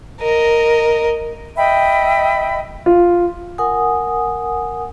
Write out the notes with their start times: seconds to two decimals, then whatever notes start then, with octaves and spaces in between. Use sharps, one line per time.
0.21 A#4 D#5
1.57 D#5 E5 G5 B5
2.86 F4
3.58 A#4 F#5 G#5 D#6